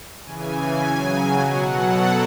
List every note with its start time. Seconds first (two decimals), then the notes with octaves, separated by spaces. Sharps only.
0.24 C#3 E3 G#5
0.81 C#3 F#3
1.40 B2 F#3 F#5
1.71 A4